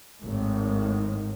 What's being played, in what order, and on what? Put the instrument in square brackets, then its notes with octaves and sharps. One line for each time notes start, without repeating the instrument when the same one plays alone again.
[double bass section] G#1 A2 D#3